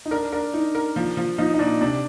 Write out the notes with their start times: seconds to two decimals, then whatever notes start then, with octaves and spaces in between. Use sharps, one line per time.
0.06 D#4
0.11 D4 A#4
0.33 D4 A#4
0.54 D#4
0.75 A#4
0.96 F3
1.17 F3
1.38 F3 D#4
1.54 D#4
1.59 A#2 D4
1.81 C3 D4